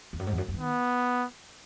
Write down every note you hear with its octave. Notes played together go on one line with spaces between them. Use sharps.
E2
F#2
G#2
E2
F#2
F#2
E3
D#3 B3